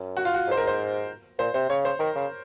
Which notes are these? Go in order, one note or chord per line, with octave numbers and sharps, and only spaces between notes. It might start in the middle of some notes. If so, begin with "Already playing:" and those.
Already playing: F#2
F#4
F4
F#4
G#2 C5
A#4
C5
A#2 C5
C3 C5
C#3 C#5
C5
D#3 A#4
C#3